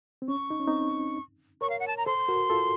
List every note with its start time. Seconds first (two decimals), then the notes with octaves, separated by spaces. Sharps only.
0.22 C4
0.28 C#4 C#6
0.50 D#4
0.60 C#4
0.67 C4 D#4
1.61 A#4 C#5 C#6
1.70 F5
1.80 F#5
1.88 A5
1.97 A#5
2.06 A4 C5 C6
2.28 F#4 A#4
2.50 F4 A4